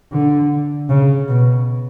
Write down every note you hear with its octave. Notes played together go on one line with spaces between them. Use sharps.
D3
C#3
B2